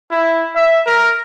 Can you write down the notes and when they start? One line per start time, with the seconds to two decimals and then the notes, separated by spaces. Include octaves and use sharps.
0.11 E4
0.55 E5
0.86 A#4